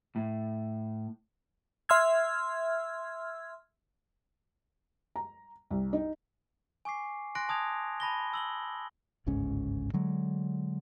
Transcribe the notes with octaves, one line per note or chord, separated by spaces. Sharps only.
A2
E5 C6 E6 F6 G#6
A#5
C2
D#4
G#5 C#6 D6 C7
G#5 C6 F#6 A#6 D7
A5 D#6 G#6 F7
A5 B5 A#6 G7
E6 F#7 G7
G1 C#2 G#2 C#4
D3 F#3 G#3